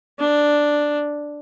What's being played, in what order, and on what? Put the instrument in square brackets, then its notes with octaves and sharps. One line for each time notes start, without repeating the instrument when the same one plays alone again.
[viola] D4